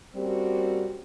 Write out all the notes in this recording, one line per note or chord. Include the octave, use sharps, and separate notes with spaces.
G3 A#3 C4 C#4 F#4 G4